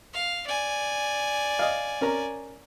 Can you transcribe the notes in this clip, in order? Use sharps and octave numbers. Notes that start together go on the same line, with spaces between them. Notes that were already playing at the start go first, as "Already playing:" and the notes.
F5
D5 G#5
D#5 F5
C#4 A#4 A#5